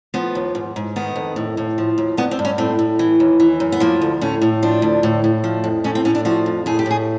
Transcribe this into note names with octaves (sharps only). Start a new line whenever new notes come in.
F3 B3
D#2
G#2
G#2
D#3 B3
F2
A2
A2
F3
D#2
G2 B3
C4
G2
C#4
A2 C4
A2
E3
D#2
E3
F#2
B3
F3 A#3
D2
A2 C#4
A2
F3 D4
D2
A2
A2
F3
F2
A2 C#4
C4
A2 C#4
D4
F3 F#4
F2
A2 G#4
G4
A2 G#4